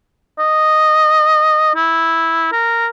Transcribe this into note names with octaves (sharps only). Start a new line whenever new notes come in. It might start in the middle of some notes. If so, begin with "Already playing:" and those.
D#5
E4
A#4